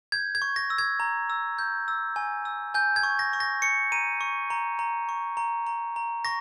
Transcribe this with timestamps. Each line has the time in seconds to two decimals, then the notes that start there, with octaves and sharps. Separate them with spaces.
0.12 G6 G#6
0.35 G#6
0.42 C#6
0.56 A#6
0.70 E6
0.78 G#6
1.00 A#5
1.30 E6
1.58 G6
1.88 E6
2.16 G#5
2.45 E6
2.74 G#5 G6
2.96 G#6
3.03 C#6
3.19 A#6
3.33 C#6
3.40 A#6
3.62 C#6 C#7
3.92 A#5 D#7
4.21 C#6
4.50 A#5
4.79 A#5
5.09 C#6
5.37 A#5
5.66 A#5
5.96 A#5
6.25 C#6 A#6